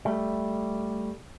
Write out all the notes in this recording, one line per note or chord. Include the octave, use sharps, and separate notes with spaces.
G3 A3